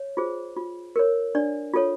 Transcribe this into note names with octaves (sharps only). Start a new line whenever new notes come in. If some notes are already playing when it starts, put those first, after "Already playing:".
Already playing: C#5
F4 G#4 C5
F4
A#4 C#5
D4 D5
F4 A4 C#5